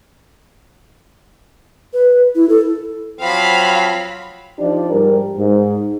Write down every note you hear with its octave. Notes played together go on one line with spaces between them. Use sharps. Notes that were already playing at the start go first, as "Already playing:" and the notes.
B4
E4
A4
F3 F#3 C4 F5 B5
F3 D4 D#4 G4 D5
G#2 G3 A#4
G#2